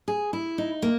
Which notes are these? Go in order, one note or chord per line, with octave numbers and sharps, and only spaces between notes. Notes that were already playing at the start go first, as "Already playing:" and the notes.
G#4
E4
D#4
A#3